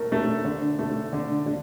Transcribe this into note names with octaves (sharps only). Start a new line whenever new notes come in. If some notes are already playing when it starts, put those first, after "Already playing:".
Already playing: A3 A#4
A3
D3
A3
D3
D3